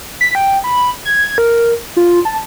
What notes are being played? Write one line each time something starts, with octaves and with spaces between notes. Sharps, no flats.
B6
G5
B5
G#6
A#4
F4
A5